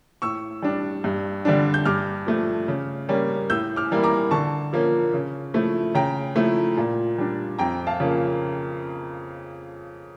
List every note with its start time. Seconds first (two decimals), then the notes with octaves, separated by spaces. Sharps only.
0.22 A2 C#6 E6
0.62 G3 D4
1.04 G2
1.45 D3 G3 D4
1.74 G6
1.85 G2 D6 F6
2.27 F3 A3
2.68 C#3
3.09 G3 A#3 C#4
3.50 A2 E6 G6
3.76 D6 F6
3.91 E3 G3 A#3 E4
4.04 A#5 D6
4.31 D3 A5 C#6
4.73 F3 A#3 C#4
5.13 C#3
5.54 F3 A3 E4
5.95 C#3 G5 A#5
6.36 F3 A3 E4
6.77 A#2
7.18 G3 D4
7.59 F2 G5 A#5
7.87 F5 A5
8.00 C#3 F3 A#3